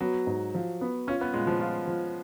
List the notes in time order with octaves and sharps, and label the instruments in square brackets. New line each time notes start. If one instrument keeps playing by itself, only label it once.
[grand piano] F#3 [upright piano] B3
[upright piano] G#2
F3
B3
[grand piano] C#4 [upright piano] F4
[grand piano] B3
[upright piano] A#2 [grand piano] G#3
[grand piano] F3
[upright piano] F4
F3